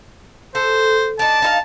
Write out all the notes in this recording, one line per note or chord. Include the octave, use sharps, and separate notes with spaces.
A4 C5
D4 D#4 A5
D#4 E4 F5